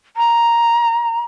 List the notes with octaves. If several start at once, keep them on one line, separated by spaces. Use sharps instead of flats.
A#5